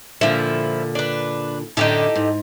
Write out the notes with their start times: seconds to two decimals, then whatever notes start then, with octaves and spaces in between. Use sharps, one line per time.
0.21 A#2 D3 F3 E4
0.95 D4 B4
1.77 F#2 A2 D3 D#4 G4 A4
2.15 G#2